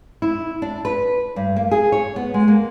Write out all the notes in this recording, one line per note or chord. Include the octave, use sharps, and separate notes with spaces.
E4
D4
B4
G2
A#3
G#4
C#5
B3
G#3
A#3